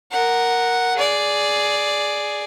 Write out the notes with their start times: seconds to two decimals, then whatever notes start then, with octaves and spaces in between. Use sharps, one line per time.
0.11 A#4 F#5
0.96 G#4 D5